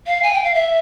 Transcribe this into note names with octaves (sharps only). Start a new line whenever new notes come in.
F5
G#5
G5
F5
E5